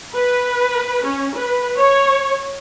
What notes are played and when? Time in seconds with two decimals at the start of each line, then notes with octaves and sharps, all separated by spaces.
0.14 B4
1.04 C#4
1.36 B4
1.78 C#5